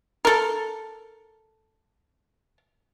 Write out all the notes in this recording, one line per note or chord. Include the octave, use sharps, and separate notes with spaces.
A4 A#4